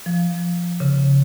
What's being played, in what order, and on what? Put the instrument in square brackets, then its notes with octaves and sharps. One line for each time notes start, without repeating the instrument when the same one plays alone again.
[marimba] F3
C#3